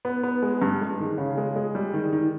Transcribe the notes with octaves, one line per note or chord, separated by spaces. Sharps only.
B3
B3
G#3
G2
G#3
D#3
C#3
G#3
G#3
G3
D#3
D#3